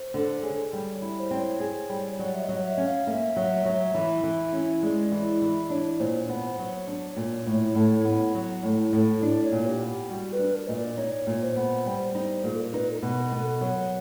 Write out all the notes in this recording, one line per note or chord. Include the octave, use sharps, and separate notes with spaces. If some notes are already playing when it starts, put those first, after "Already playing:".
Already playing: C5
D3
G#4 C#5
G3
E4
C5
C4 C#5
G#4
G3
F#3 D5
E5
D#5
F#3
D#5
E5
C#4
F5
A#3 E5
F#3
F#3
E3
E3
C#4
G#3 D5
E3
E3
D4 C#5
A#2 C5
C#5
B3 C5
C5
F#3 C#5
D4
A#2
A2
A2
B3
F#3
A2
A2
D4 D5
C#5
A#2
G4
B3
G4
G3 F#4
B4
D4
A#4
A#2 D#5
D5
D#4 C#5
A#2
C5
B3
G3 C5
D#4
A#2 G#4
A4
A#4
D#4 B4
A4
A#4
B2
A#4
B3 A#4
A4
F#3 A#4